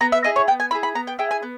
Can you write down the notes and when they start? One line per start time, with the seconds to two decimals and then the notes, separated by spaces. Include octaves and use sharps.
0.01 B3 A#5
0.12 E5
0.24 E4 G#4 D#5
0.36 C#5
0.48 B3 G5
0.60 G#5
0.71 E4 G#4 B5
0.83 B5
0.95 B3 A#5
1.07 G5
1.19 E4 G#4 G5
1.31 G#5
1.43 B3